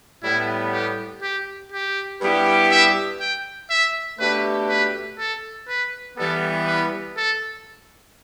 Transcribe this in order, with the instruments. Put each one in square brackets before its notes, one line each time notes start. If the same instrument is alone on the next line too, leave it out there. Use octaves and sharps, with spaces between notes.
[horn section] A2 G3 B3 [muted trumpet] E4
[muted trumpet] G4
G4
G4
[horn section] G2 G3 B3 E4 G4
[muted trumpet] E5
G5
E5
[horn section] B2 A3 D4 G4 [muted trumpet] B4
[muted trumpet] B4
A4
B4
[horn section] E3 G3 B3 [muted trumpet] A4
[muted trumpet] B4
A4